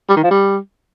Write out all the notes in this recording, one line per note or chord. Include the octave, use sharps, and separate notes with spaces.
G3
D#3
F3
G3